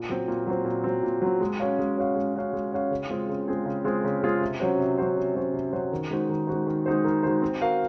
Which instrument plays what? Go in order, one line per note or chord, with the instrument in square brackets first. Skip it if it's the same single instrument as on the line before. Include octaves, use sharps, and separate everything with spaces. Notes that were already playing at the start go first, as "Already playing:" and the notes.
Already playing: [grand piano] A#2
F#3 C4
A#2
F#3 C4
A#2
F#3 C4
A#2
F#3 C4
G#3
C#4 F#4 C#5 F5
G#3
C#4 F#4 C#5 F5
G#3
C#4 F#4 C#5 F5
G#3
C#4 F#4 C#5 F5
C#3
G#3 C4 F4 G#4
C#3
G#3 C4 F4 G#4
C#3
G#3 C4 F4 G#4
C#3
G#3 C4 F4 G#4
C3
F#3 C#4 F#4 C5
C3
F#3 C#4 F#4 C5
C3
F#3 C#4 F#4 C5
C3
F#3 C#4 F#4 C5
D#3
G#3 D#4 F#4 C5
D#3
G#3 D#4 F#4 C5
D#3
G#3 D#4 F#4 C5
D#3
G#3 D#4 F#4 C5
C4
F#4 A#4 F5